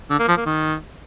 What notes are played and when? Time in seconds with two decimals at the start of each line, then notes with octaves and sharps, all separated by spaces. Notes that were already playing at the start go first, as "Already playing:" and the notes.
0.10 D3
0.19 A#3
0.28 F3
0.37 A#3
0.46 D#3